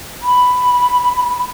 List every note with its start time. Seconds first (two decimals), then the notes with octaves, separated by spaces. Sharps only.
0.22 B5